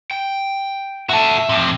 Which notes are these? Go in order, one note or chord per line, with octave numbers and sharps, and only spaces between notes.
G5
F#4 A4 E5
F2 C3